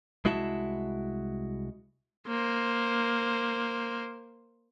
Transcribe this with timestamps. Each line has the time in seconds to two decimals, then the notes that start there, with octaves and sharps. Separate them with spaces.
0.25 C2 G#3 E4 F#4 E5 A5
2.27 A#3 C5